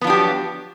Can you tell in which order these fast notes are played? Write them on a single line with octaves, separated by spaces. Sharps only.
B3 F3 D4 G4 F#3